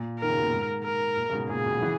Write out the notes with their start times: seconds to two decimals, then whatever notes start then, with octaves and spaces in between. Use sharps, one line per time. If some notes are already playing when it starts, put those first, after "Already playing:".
Already playing: A#2
0.20 D#3 A#4
0.30 C#3
0.37 B2
0.45 A#2
0.53 G#2
0.85 A#4
1.17 A#2
1.30 C#3
1.33 G#2 B2
1.49 A#2 C#3 G#4
1.65 B2 D#3
1.77 F#3
1.82 C#3 E3